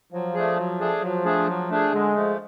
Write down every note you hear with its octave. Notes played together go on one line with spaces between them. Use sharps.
F3 F#3
A3 D4 G#4
F#3
A3 D4 G#4
F3 F#3
A3 D4 G#4
F#3
A3 D4 G#4
D3 G#3
F3 A3